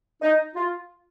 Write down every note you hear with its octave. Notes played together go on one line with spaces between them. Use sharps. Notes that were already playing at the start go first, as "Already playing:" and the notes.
D#4
F4